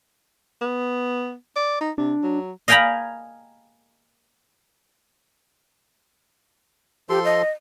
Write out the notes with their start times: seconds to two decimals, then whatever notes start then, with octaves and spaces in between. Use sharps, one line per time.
0.61 B3
1.56 D5
1.80 D#4
1.98 C3 D4
2.23 F#3
2.68 D#5 F5 G5 G#5 A#5 B5
7.09 F3 G4 A4 C6
7.24 D#5